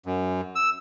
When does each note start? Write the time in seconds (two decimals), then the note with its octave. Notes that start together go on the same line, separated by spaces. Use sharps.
0.06 F#2
0.56 E6